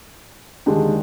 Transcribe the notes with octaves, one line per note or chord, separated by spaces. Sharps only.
D#2 D3 G#3 D4 G4